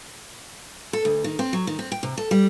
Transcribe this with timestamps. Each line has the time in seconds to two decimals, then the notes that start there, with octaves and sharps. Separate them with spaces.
0.93 A4
1.05 D2
1.24 D#3
1.39 C4
1.53 F#3
1.67 D#3
1.79 C4
1.92 G5
2.03 C3
2.18 A4
2.31 G3